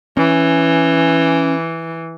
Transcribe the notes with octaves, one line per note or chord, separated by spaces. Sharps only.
E3 C#4